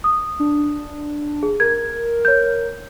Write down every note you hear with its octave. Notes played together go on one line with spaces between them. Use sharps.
D#6
D4
G#4
A#4 G#6
C#5 G6